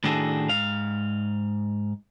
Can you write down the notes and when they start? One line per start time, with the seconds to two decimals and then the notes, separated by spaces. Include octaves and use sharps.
0.04 A2 D#3 D4 F#4 G#4 A4
0.49 G#2 F5